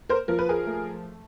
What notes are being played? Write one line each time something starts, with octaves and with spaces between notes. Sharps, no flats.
A#4 C5
F3 A#4
B4
G#4 A#4
A3